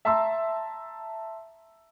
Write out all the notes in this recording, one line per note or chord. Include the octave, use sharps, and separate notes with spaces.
E5 A5 A#5 C6 E6